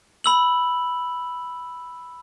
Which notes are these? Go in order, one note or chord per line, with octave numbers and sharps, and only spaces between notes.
B5 E6 F#7